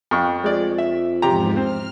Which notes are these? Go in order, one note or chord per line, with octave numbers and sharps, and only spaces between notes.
F2 C#6
F2 G#3 D5
E5
E2 G#2 C3 F3 G4 A#5
C4 F6